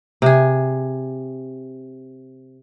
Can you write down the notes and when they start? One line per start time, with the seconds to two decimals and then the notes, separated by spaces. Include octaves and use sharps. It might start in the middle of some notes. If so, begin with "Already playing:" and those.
0.22 C3 G#4